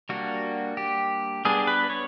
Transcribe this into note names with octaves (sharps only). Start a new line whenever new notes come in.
G3 A#3 D4 F#4
G4
G3 B3 D4 G#4
B4
C#5